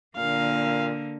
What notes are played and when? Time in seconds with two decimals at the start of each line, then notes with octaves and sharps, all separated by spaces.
0.17 A#2 D3 A#3 F5